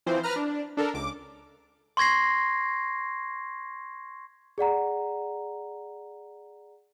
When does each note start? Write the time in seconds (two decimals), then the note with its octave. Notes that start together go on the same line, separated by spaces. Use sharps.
0.06 E3 F3 C4 C5
0.23 B4 A#5 F6
0.36 D4
0.77 D4 A4 A#4
0.94 C#2 D6
1.97 C6 C#6 G#6 A#6 C7
4.58 G#4 D5 F#5 A#5